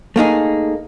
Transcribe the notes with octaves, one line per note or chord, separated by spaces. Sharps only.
A3 A#3 D#4 G#4